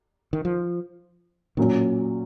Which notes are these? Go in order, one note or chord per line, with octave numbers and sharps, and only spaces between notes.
D#3
F3
A#2 D#3 F#3 C#4